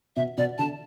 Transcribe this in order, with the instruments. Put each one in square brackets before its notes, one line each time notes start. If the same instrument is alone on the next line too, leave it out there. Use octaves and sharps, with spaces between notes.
[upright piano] B2 [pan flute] E5
[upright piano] B2 [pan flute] D5
[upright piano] D3 [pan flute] A5